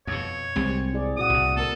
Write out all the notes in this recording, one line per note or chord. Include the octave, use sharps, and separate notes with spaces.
F2 B2 C#5
C2 G3 G#3 C4
E4 G#4 D5
A#2 F#4 F#5 D#6
C2 A2
A#3 A4 A#4